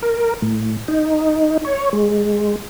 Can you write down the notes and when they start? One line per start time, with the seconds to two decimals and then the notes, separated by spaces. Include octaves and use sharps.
0.02 A#4
0.42 A2
0.88 D#4
1.65 C#5
1.93 G#3